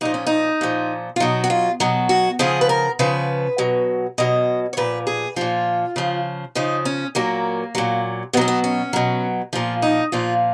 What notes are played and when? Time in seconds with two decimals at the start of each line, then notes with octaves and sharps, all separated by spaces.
0.01 A#2 F3 D#4
0.14 C#4
0.27 D#4
0.61 A#2 F3
1.16 F4
1.20 B2 F#3 D#4
1.44 F#4
1.50 F4
1.80 B2 F#3
2.09 F#4
2.39 C#3 F3 G#4
2.61 B4
2.69 A#4
2.99 C#3 F3 B4
3.58 B2 F#3
4.18 B2 F#3 D#5
4.73 C#5
4.77 A#2 F3 B4
5.07 G#4
5.36 A#2 F3 F4
5.96 C#3 F3
6.55 C#3 F3 D#4
6.85 C#4
7.15 A#2 F#3 A#3
7.75 A#2 F#3
8.33 B2 B3
8.37 F#3 C#4
8.48 B3
8.64 C#4
8.93 B2 F#3
9.53 A#2 F3 F4
9.82 D#4
10.12 A#2 F3 F4